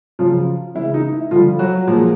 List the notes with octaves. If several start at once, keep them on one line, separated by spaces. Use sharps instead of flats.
C#3 F3 F#3 F4
C#3 E3 G#3 E4
D#4
E4
D3 F3 G3 F4
F#3 F#4
A#2 F3 G#3